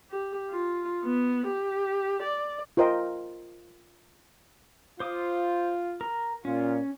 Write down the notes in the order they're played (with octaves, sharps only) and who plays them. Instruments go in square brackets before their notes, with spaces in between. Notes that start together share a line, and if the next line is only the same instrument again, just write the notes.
[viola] G4
F4
B3
G4
D5
[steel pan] F4 A#4 C5 D#5 G5
[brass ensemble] F4 [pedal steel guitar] C5 D6 D#6
[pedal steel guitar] A#4
[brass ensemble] A#2 F4 [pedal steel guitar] C#4